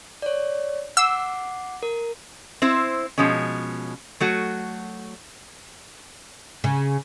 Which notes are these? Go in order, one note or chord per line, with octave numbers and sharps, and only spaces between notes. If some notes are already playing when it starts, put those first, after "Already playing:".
C#5 D5
F#5 D6 E6 C7
A#4
C4 E4 C5
B2 F3 G#3 C#4
F#3 A3 F#4
C#3